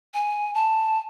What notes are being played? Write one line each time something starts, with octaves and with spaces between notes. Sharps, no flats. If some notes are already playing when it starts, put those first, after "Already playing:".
G#5
A5